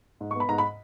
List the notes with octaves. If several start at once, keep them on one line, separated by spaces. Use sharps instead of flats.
G#2
C#6
B3
B5
G#2 A#5
B5